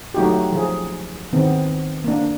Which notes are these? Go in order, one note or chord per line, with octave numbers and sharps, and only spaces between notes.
F#3 A3 D#4 F#4 G4
F3 G#4
D#3 B3 C4
A#3 D4